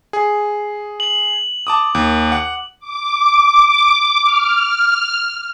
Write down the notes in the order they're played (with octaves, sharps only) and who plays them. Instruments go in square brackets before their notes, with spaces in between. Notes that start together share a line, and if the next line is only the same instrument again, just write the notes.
[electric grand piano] G#4
[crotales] F#7
[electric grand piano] A5 D6 D#6
D#2
F#5
[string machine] D6
F6